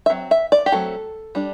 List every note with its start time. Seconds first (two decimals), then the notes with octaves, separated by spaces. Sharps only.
0.06 E5
0.10 F#3 C4
0.31 E5
0.52 D5
0.66 G4
0.72 F#3 A3 C4 A4
1.35 G3 D4